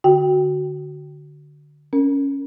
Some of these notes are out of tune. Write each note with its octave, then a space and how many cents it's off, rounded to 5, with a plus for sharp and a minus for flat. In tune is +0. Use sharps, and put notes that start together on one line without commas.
D3 +0 F#4 +5 G5 +0
C#4 +5 A#4 +0